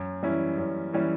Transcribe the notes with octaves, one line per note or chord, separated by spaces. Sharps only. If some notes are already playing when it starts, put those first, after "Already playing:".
Already playing: F#2
E3 G3 C#4 E4
F#2
E3 G3 C#4 E4